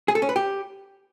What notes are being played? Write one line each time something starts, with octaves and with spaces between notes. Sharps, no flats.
G#4
A4
C#4
B4
G4